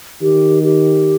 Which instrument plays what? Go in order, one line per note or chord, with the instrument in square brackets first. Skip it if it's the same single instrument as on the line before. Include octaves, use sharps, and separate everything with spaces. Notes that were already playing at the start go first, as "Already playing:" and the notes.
[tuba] D#3 [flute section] G4
[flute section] G4